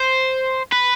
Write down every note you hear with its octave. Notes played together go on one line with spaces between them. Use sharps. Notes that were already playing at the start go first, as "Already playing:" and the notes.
Already playing: C5
B4